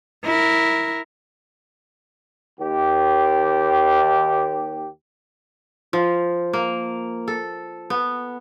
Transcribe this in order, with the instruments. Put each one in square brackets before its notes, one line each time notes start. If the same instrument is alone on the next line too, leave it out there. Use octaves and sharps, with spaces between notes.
[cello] E4 A#4
[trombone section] D#2 G4
[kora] F3
A#3
A4
B3